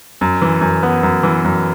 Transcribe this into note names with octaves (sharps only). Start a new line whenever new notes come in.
F#2
E3
F#2
B3
F#2
E3
F#2